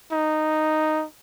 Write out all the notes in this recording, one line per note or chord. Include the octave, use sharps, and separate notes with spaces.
D#4